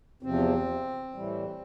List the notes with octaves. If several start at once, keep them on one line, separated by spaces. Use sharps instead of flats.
E2 C3 F3 C4
A2 E3 G3